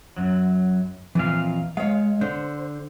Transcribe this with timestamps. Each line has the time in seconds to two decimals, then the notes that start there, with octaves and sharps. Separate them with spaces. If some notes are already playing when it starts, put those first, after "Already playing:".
0.17 F#2 F#3
1.15 F2 A#2 E3 F5
1.77 G#3 C#5 F5
2.21 D3 C5